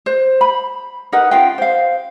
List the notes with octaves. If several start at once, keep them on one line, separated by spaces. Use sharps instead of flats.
C5
B5
D#4 A#4 B4 F#5
C#4 F4 F5 G5
C5 F5